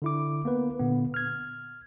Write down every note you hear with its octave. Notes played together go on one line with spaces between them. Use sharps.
D3 E4 D6
A#3 B3 B4
A#2 D3 B3
F6 G#6